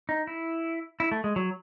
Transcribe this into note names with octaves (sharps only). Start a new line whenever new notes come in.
D#4
E4
E4
A3
G#3
F#3